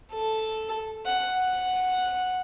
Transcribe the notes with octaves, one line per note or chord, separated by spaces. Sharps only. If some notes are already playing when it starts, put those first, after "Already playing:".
A4
F#5
F#5